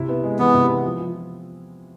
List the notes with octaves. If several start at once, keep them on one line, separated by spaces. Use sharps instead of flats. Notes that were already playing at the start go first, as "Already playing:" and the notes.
Already playing: C3 E4
B3
G#3
E3 B3
C3
B3
F3
F3